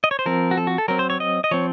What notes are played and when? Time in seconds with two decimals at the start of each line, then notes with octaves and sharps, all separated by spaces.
0.04 D#5
0.11 C#5
0.19 C5
0.26 F3 C4 A#4
0.51 F#4
0.57 A4
0.67 F#4
0.78 A4
0.88 F#3 C4 A#4
0.99 C5
1.10 C#5
1.20 D#5
1.44 D#5
1.51 F3 C4 C#5